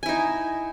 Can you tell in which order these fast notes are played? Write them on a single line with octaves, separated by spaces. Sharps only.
G#5 E4 D#4